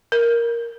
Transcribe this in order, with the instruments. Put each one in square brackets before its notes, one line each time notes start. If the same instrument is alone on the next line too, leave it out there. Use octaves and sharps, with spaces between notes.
[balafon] A#4